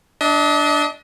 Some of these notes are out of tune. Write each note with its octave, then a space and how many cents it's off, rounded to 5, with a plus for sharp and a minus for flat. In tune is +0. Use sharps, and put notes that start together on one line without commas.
D4 +0 D#5 +40